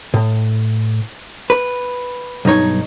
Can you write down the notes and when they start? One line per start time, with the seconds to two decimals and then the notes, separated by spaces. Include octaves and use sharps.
0.14 A2
1.50 B4
2.45 B1 G2 D#4 C#5